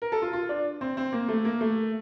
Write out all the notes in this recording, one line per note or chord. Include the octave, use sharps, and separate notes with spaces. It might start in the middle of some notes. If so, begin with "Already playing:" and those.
A#4
A4
F4
F4
D4
C4
C4
A#3
A3
A#3
A3